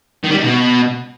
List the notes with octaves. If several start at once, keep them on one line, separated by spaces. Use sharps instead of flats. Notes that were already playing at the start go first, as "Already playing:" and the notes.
D#3
G3
D#3
B2